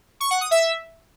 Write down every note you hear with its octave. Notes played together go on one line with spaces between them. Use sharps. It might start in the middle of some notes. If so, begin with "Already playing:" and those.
C#6
F#5
D#6
E5